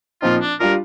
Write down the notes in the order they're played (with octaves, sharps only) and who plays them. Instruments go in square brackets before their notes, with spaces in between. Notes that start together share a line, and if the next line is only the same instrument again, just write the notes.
[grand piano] A#2 F3 C4 D#4 [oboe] F4
[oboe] D4
[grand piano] G3 D4 F4 [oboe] A#4